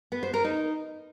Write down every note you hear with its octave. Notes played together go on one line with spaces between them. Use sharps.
B3
C5
A#4
D#4